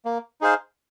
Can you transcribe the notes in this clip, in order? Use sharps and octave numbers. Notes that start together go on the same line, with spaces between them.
A#3
D#4 G#4 C5 F5